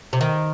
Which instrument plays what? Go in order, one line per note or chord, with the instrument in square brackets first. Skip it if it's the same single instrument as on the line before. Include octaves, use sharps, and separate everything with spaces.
[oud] C3
D#3